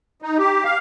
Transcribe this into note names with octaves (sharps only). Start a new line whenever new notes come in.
D#4
G4
F5